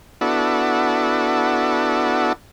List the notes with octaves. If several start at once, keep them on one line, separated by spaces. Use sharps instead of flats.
B3 D4 E4 F#4 A4